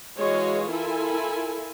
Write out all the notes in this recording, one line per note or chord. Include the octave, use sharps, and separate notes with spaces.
E3 G#3 F#4 C#5 D#5 F5
E4 F4 A4 A#4 G#5